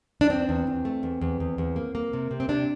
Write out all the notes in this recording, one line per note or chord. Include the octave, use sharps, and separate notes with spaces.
D4
E2 C4
E2
E2
A3
E2
E2
E2
E2
A#3
A#3
C3
C3
C4
C3 D4